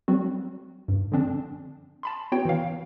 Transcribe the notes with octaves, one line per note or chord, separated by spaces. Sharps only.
F#3 G3 C4 F#4
G2
D3 F3 C4 D4
A5 B5 C6
B3 E4 F#4 C#5 G5
E3 F5